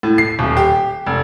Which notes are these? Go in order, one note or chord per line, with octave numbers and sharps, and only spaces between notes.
A2
C7
D#1
G4
F1